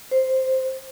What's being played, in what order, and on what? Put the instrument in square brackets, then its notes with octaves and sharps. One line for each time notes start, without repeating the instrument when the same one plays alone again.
[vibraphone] C5